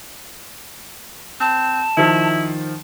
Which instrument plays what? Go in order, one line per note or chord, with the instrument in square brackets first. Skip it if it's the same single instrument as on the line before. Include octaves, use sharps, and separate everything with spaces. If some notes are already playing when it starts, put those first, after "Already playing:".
[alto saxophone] C4 [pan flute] A5
[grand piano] D#3 F3 [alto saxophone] E4